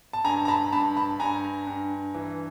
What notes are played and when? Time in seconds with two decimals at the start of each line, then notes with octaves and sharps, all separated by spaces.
0.13 A5
0.24 G2 G#5 A#5
0.45 A#5
0.48 A5 B5
0.73 G2 A5 B5
0.97 A5 B5
1.20 G2 G#5 A#5
1.67 G2
2.15 E3